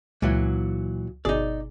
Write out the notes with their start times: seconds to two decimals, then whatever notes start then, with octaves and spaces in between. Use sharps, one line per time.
0.22 C#2 A#2 E3 F#3
1.25 G1 B2 D#4 G#4 D5